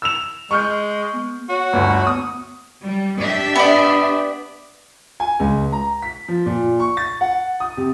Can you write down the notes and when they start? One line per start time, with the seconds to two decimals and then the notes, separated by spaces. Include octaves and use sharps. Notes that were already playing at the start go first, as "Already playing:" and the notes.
0.02 E6 E7 F7
0.51 G#3 C#6 F6 G6
1.13 B3
1.49 F#4 C#5
1.73 G1 D2
2.07 B3 D#6
2.84 G3
3.19 D4 G4 E5
3.56 B3 D5
5.20 G#5
5.40 C#2
5.72 A#5
6.02 B6
6.28 F3
6.46 A#2
6.80 C#6
6.97 A6
7.21 F#5
7.60 D#6
7.77 C3